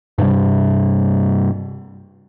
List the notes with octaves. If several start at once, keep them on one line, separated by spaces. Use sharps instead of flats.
G2 C3 G3